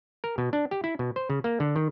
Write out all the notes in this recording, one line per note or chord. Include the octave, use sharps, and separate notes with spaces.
A#4
B2
D4
G4
E4
B2
C5
C#3
A#3
D3
D#3